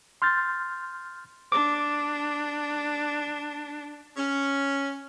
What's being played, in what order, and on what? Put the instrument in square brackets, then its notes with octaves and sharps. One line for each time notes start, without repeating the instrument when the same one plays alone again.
[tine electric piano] C6 F6 G6 A6
[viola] D4 [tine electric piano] D6
[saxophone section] C#4